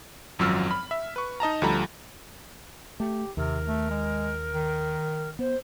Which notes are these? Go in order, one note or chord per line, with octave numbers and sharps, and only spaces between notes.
G#1 F#2 F3 F#3 E6 F6
B5
E5
B4 C#6
D#4 D#5 A5 A#5
D2 F3 G3 A4 A#5 B5
A3 G4
D#2 C3 A#4
A3
G#3
D#3
B3 C5